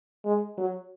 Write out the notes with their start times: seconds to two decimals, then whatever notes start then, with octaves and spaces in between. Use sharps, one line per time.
0.25 G#3
0.58 F#3